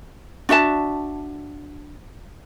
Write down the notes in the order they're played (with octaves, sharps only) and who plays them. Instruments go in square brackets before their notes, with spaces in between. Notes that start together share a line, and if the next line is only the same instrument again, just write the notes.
[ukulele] D4 F#4 E5 A5